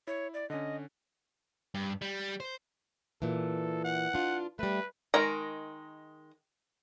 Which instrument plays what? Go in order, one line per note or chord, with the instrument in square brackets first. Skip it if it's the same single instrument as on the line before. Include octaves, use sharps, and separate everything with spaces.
[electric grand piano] E4 [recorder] C#5
[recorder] D5
[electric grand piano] D3 C#4 [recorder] D#5
[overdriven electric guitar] G2
G3
C5
[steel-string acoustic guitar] A#2 E3 [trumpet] A4
[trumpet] F#5
[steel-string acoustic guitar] D4 F4
[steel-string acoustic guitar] G3 A3 [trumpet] B4
[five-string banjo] D#3 G#3 A#4 A#5